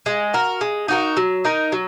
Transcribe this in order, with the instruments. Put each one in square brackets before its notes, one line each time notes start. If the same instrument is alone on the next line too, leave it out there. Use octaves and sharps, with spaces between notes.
[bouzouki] G#3
F#4 A#4
G#3
D#4 F#4 A#4
F#3
D#4 A#4
F#3